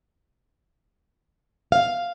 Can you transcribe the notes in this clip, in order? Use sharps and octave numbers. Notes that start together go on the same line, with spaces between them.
F5